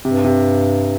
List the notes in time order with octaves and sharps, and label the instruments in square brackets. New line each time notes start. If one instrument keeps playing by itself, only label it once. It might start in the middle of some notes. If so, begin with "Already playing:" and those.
[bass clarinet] G2 [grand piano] C3
[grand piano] C3